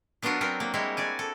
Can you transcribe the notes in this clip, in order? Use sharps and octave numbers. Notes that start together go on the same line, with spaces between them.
F#3 B3 D4 F4 F#4 A#4
F#3 B3 C4 A#4
A#3
G3 G#3 A#3 E4 F#4
F#4 D5 G#5
A4